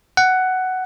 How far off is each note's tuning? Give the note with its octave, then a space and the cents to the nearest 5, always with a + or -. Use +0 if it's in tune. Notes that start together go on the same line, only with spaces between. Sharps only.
F#5 +10